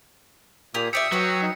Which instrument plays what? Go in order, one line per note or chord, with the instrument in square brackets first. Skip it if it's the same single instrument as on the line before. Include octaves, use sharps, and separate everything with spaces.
[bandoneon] A#2 A#3 [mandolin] G4 G#4 D#6
[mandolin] G4 D5 E5 [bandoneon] D#6 E6 [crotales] B6 C#7
[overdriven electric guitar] F#3 [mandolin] B4 C#5 G5
[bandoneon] D#4